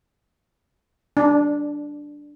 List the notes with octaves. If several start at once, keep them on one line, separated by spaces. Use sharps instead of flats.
D4